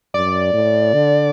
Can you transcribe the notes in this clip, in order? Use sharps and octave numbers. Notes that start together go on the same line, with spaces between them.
F#2 D5
A2
D3